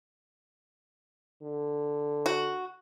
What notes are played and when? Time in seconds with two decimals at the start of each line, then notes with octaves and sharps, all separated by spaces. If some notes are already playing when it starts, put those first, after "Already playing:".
1.43 D3
2.26 F#4